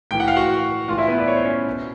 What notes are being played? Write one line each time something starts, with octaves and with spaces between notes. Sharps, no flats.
A2 E3 G5
F#5
F5
F#4 F#5
A2 E3 F4 F5
E4 E5
B3 B4
D5
C#5
C5
C#4 C#5
B2